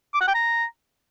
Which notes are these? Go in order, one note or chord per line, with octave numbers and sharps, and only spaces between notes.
D6
F#5
G5
A#5